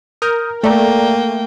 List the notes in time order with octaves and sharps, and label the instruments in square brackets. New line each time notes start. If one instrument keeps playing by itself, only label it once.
[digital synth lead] A#4 [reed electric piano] D#6 F6 G6
[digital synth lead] A3 [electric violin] A#3 G5 [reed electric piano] A4 D5 A#5